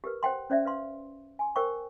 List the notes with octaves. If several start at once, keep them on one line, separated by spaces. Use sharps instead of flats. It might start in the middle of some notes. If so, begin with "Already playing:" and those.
G4 A#4 B4
C5 F#5 G5 C6
C#4 C5 D5 E5
B4 F5 C6
G#5 C6
A#4 C5 G5 C#6